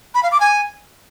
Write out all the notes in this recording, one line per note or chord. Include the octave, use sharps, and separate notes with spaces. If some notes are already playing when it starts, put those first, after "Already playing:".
B5
F5
D6
G#5